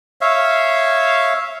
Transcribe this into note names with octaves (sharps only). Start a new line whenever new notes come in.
C#5 E5 F5